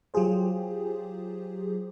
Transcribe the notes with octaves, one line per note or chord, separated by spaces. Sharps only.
F#3 F4 G4 G#4 C5